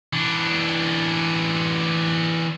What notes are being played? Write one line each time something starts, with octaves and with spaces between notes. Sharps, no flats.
E3 D4